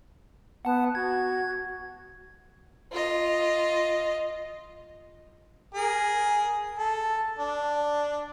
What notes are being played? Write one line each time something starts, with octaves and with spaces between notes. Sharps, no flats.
B3 F#5 A5
F#4 G#6
F4 D#5
G#4 A#4
A4
D4